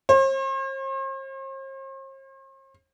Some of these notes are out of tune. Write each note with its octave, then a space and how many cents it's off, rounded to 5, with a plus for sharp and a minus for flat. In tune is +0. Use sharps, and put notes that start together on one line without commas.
C5 +45